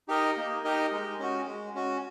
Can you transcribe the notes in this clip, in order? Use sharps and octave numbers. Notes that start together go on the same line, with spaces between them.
D#4 G4 A#4 D#5
A#3
D#4 G4 A#4 D#5
G#3
C#4 F#4
G#3
C#4 F#4